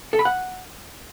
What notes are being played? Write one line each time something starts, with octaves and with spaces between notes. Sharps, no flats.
A4
B5
F#5